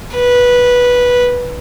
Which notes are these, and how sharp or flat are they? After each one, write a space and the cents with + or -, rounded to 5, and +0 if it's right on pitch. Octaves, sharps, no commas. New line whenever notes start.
B4 -10